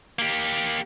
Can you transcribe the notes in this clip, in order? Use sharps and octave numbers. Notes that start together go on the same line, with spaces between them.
A#3 G4